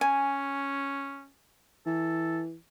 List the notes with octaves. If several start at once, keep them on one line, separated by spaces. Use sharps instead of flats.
C#4 G#5
E3 A4